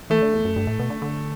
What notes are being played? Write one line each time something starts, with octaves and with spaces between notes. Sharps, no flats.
E3 A3
D3
E2
F#2
G2
A2
B2
D3
D3